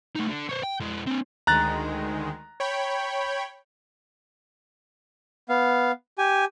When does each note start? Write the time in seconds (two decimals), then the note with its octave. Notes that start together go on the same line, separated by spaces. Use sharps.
0.16 A3 D#4
0.28 D3
0.49 C5 C#5
0.63 G5
0.80 G#3 E4
1.07 C4 D4
1.47 D2 D#3 G#3 A#5 F#6 A6
2.60 C#5 G5 B5
5.49 B3 F5
6.18 G4 G#5